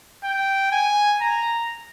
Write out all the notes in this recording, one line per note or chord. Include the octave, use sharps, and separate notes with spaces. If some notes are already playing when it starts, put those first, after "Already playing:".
G5
G#5
A#5